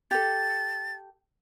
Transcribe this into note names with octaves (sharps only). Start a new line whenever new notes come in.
G4 A4 A6